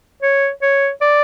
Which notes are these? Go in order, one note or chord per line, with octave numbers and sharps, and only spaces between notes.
C#5
C#5
D5